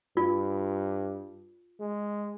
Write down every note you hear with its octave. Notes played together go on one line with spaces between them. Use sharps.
G2 F4
G#3